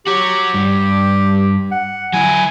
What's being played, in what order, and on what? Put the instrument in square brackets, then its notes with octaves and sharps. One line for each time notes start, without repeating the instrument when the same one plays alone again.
[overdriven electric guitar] F#4 C#5 [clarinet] G4
[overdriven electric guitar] G2
[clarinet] F#5
[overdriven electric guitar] F#3 E4 [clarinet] G#5